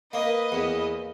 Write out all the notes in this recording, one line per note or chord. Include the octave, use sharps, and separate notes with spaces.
A#3 B4 D#5
E2